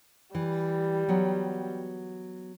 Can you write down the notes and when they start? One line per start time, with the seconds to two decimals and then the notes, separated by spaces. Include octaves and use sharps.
0.35 E3 G3
1.09 F#3 B3